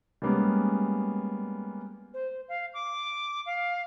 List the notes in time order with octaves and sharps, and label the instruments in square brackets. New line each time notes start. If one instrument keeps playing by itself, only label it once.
[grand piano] G3 G#3 A#3 B3 C#4
[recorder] C5
F5
D6
F5